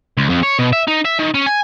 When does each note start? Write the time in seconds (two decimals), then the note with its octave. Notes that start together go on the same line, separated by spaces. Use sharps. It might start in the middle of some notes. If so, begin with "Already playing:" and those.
0.17 C#2
0.29 F2
0.43 C#5
0.59 B2
0.73 E5
0.88 D#4
1.05 E5
1.19 D#3
1.34 C#4
1.47 G#5